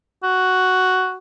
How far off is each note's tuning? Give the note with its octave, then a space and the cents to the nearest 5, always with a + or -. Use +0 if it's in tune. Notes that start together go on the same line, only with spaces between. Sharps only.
F#4 +5